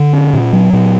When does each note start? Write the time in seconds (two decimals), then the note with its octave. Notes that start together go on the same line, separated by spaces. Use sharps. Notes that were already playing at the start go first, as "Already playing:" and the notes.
Already playing: D3
0.13 C#4
0.33 A#2
0.53 F#3
0.73 A#2